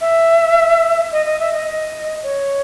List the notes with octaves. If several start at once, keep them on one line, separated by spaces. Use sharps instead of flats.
E5
D#5
D#5
E5
D#5
C#5